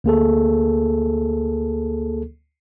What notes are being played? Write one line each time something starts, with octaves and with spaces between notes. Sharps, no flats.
D2 A#3 G#4 A4